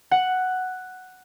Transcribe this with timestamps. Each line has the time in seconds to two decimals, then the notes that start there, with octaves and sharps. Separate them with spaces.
0.11 F#5